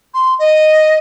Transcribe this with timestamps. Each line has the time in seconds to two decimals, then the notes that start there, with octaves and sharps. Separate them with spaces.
0.14 C6
0.39 D#5